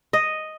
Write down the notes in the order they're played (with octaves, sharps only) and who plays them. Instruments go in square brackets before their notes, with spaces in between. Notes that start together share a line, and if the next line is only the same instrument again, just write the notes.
[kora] D#5